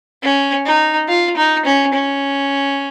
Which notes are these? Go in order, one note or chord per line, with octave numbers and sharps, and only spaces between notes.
C#4
D#4
F4
D#4
C#4
C#4